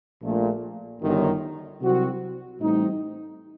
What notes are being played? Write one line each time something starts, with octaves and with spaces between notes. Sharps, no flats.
A#1 A#2 A3
G1 F#2 D#3
C2 C3 F#3 C4 F#4
A1 A2 G3 C4 D#4